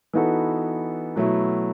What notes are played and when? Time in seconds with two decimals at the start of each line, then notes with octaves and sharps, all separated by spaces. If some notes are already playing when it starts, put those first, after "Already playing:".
0.13 E3 B3 D#4 F#4 A4
1.16 B2 F#3 A3 E4